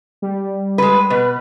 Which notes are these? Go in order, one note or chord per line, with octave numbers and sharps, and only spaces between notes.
G3
G#3 B4
B2 B4